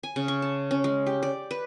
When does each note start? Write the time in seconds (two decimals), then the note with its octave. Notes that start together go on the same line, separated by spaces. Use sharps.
0.03 G#5
0.16 C#3
0.28 C#6
0.42 A5
0.71 C#4
0.84 G#3
1.06 G4
1.23 D5
1.51 B4